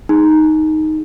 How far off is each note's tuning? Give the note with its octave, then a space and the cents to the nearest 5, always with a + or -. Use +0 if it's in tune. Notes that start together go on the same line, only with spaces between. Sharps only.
D#4 +0 G#4 +0